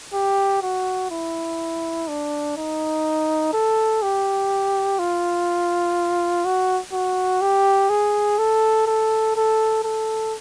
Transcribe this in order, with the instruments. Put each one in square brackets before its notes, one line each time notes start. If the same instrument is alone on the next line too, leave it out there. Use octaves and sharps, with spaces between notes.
[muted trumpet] G4
F#4
E4
D4
D#4
A4
G4
F4
F#4
F#4
G4
G#4
A4
A4
A4
A4